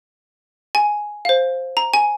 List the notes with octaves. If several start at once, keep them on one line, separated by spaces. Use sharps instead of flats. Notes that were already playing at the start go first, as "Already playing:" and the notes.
G#5
C5 F5
A#5
G#5